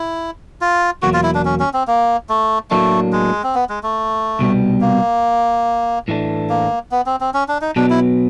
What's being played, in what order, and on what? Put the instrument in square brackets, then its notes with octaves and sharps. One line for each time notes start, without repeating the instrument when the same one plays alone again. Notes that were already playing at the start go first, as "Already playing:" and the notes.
Already playing: [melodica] E4
F4
[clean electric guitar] E2 B2 F#3 A#3 [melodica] F#4
[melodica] F4
E4
D4
C#4
C#4
C4
A#3
A3
[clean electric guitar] A2 F#3 A#3 D4 [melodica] A3
[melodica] G#3
C4
B3
G#3
A3
[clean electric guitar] C2 B2 G3 B3
[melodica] A#3
[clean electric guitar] A2 E3 A3 D4
[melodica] A#3
B3
C4
C4
C#4
D4
D#4
[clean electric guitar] B2 F#3 B3 [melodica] D4
[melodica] E4